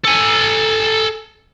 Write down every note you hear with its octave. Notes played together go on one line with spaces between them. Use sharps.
A4 G#5